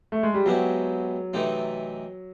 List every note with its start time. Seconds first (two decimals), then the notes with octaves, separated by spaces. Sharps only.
0.12 A3
0.23 G#3
0.34 G3
0.46 B2 F#3 G#3 C4 E4 G4
1.33 C3 E3 A3 C4 D#4